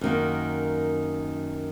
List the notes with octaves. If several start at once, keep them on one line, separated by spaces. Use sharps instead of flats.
F#2 D#3 A#3